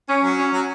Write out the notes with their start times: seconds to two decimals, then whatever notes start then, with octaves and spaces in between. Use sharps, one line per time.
0.09 C#4
0.24 F#3
0.38 C#4
0.54 F#3